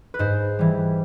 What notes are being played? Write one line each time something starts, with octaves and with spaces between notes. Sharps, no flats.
B4
G#2 C5
E3 G3